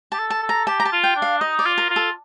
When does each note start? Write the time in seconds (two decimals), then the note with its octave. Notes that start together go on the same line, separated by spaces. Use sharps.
0.12 G4 A5
0.19 A4
0.30 A5
0.42 A4
0.49 A#5
0.67 G4 A5
0.80 A#5
0.85 A5
0.92 F4
1.04 G5
1.16 D4
1.22 F5
1.41 D#4 D#5
1.59 D5
1.65 F4
1.78 A#4
1.90 F4
1.96 A4